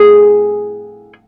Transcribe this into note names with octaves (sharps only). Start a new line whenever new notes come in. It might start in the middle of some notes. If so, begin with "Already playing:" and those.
Already playing: G#4